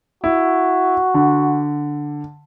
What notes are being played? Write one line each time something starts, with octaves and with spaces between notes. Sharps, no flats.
E4 F#4
D3